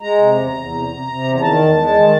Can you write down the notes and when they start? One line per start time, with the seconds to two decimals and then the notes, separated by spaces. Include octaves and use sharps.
0.01 G#3 A#5
0.18 C3
0.36 E2
0.54 E2
0.71 C3
0.89 C3
1.07 C3
1.24 E2
1.35 A#5
1.42 D#3 A5
1.58 E2
1.76 G#3
1.94 D#3